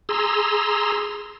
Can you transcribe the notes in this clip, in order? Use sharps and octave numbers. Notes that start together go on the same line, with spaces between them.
G#4 A#5 C6 E6